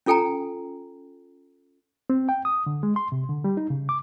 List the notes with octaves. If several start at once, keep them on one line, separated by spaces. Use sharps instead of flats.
C#4 F4 A4 G5 G#5 A#5
C4
G5
D#6
D3
G#3
C6
C3
D3
G3
D#4
C#3
D6